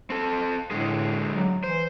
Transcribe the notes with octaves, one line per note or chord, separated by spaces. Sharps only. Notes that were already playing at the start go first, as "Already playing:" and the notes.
C4 A4
A2 D3 G#3 G#4
F#3
E3 C5